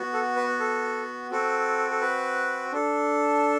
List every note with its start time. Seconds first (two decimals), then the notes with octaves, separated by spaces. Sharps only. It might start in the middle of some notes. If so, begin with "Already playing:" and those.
Already playing: B3 F#4
0.13 A4
0.36 B4
0.60 A4
1.31 C4 F#4 A4
1.90 A4
2.01 B4
2.72 D4 A4